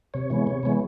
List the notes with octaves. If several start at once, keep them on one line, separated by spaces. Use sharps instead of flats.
C3 C#5
E3 G#3 B3
C3
E3 G#3 B3